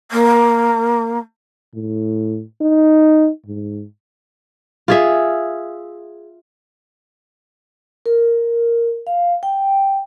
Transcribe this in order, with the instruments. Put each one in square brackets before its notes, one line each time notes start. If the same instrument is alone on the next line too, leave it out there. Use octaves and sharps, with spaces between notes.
[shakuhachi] A#3
[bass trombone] A2
D#4
G#2
[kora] F4 G#4 E5
[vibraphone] A#4
F5
G5